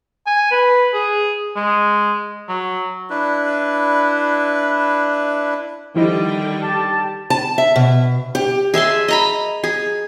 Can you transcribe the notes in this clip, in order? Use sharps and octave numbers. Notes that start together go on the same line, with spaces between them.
G#5
B4
G#4
G#3
F#3
D4 E4 B4
D3 D#3 F3 G3 E4 D#5 G5
G4 A5
A5
E5
B2
G4
G#4 E5 A5 C6
D#5 A#5 B5
G#4